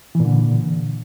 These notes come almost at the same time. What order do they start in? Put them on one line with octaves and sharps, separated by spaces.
E3 A#2 D3